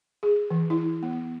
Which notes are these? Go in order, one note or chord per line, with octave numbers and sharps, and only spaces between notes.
G#4
E3
E4
B3